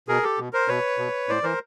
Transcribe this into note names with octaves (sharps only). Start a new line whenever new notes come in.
B2 G#4 A#4
G4 A4
B2
A#4 C5
B2 B4 C#5
B2
A2 C5 D5
E3 A#4 C5